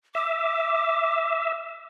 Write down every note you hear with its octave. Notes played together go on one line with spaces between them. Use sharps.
E5 D6